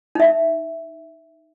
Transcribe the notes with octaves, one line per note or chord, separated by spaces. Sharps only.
D#4 E5